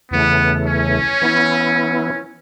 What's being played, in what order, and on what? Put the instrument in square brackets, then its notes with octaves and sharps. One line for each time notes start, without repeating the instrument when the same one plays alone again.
[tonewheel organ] E2 C#3 E3 A3 [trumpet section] B3
[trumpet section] C#4
[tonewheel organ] E3 B3 E4